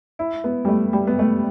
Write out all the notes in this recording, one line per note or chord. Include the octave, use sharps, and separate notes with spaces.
E4
B3
G3
A3
G3
B3
A3